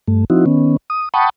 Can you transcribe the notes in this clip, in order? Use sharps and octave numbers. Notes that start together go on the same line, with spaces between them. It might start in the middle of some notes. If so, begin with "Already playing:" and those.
G2 A3
F3 C4 D#4 E4 F#4
D#3 B3 C#4
D#6
F#5 G5 A5 B5 C#6 D#6